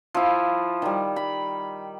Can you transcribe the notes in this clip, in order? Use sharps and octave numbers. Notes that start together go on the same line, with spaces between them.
F3 E4
D#3 G3
B5